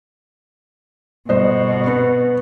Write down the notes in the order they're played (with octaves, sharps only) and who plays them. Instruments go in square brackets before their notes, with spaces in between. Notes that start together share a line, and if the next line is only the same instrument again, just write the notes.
[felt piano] G1 C5 D#5 [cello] B2
[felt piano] B3